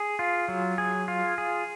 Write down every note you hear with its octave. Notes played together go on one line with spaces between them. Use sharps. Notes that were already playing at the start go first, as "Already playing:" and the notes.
Already playing: G#4
F4
F#3
G#4
F4
G#4